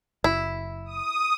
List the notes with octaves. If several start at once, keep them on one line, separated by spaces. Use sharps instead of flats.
F#1 E4
D#6